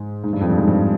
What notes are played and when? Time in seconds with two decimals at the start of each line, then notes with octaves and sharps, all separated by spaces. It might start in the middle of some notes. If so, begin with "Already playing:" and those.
Already playing: G#2
0.24 G#2
0.33 G2
0.41 F2
0.50 G2
0.58 G#2
0.68 G2